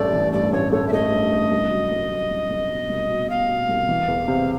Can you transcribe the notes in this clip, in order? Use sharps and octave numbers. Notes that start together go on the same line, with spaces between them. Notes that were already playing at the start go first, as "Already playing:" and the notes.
Already playing: A1 G2 E3 A3 D5
E3
G2 D5
A1 C#5
A3 C#5
E5
A3 D#5
G2
G2
C2
F#3
C2
F#3
C2
C2
B2
C2
B2
B2 F5
B2
C2
E3
E2
C3